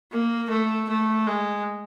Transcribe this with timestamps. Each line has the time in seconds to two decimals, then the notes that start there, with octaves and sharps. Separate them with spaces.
0.12 A#3
0.50 A3
0.89 A3
1.26 G#3